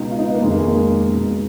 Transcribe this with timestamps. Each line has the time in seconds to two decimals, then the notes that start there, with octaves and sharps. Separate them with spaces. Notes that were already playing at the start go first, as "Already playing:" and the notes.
Already playing: C#2 B2 D#4
0.11 F4
0.19 D#4
0.27 B3
0.35 A#3
0.43 F1 D#2 D#3 G#3
0.52 A#3
0.60 G#3
0.68 A#3
0.76 G#3
1.09 C#2 B2